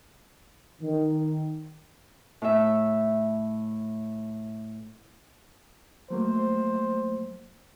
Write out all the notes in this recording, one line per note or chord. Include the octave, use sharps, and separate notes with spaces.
D#3
A2 E5
F#3 A3 A#3 C5